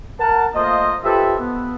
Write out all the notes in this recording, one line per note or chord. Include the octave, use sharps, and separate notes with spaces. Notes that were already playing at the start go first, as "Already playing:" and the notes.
A#4 F#5 A5
A3 A#3 F4 C5 D#5
F4 G4 A4 B4 C5 E5
B3